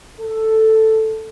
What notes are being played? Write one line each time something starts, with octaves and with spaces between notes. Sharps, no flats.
A4